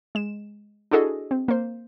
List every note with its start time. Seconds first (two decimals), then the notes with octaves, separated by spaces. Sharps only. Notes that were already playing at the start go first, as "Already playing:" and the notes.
0.15 G#3 E7
0.91 D4 E4 F#4 G#4 A4 D#5
1.31 C4
1.48 A#3 C5